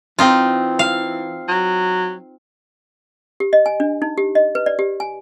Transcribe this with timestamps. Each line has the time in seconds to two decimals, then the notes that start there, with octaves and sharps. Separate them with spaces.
0.19 E3 C4 D#4 F4
0.79 F5
1.48 F#3
3.40 G4
3.53 D#5
3.66 G#5
3.80 D4
4.02 D#4
4.18 G4
4.35 D#5
4.55 B4
4.66 D5
4.79 G4
5.00 G#5